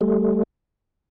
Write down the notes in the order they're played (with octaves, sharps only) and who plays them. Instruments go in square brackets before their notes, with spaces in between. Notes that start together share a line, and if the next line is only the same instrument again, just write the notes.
[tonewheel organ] G3 A3